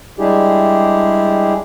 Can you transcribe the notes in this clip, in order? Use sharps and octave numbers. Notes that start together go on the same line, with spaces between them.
G3 G#3 D4 E4 G4 G#4